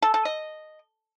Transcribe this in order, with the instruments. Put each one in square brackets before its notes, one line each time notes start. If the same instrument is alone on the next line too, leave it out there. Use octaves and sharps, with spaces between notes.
[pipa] A4
A4
D#5